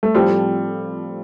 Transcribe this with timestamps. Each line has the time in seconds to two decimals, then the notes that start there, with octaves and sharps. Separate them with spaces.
0.03 A3
0.14 A2 F3 G3 C4 F4 A4